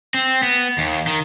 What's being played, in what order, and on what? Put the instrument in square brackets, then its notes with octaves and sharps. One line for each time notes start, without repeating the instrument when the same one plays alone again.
[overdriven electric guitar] C4
B3
D#2
D#3